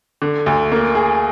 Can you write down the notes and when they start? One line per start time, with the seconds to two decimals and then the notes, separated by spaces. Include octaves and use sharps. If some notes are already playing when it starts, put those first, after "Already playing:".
0.22 D3
0.46 D2
0.72 A#3
0.95 G#4